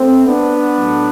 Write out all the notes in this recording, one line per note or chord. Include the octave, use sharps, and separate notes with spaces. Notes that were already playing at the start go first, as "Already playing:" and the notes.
Already playing: A3 C4
B3 D4
A2 F#3